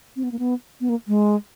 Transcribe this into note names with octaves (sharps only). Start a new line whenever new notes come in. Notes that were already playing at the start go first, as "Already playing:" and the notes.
C4
B3
A#3
B3
B3
A#3
G#3